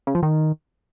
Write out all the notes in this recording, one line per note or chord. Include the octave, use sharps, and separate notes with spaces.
C#3
F3
D#3